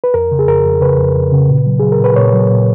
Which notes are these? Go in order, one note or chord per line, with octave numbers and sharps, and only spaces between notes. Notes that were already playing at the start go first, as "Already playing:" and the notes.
B4
F2 A#4
C#3
G#4
F2 A#4
F2
C#3 B4
F2
F2
C#3
A#2
F#3
F#3 G#4
A#4
A#2 B4
A#2 C#5
F#3
A#2